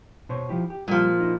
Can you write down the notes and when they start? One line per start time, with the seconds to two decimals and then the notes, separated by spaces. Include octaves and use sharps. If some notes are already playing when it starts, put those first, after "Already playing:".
0.29 B2 C5 C#5
0.49 F3 E4 G4
0.70 G4
0.88 A#2 F3 G3
1.20 D#4 E4